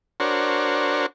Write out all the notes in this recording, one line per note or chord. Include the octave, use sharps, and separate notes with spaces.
D4 F#4 A#4 C5 C#5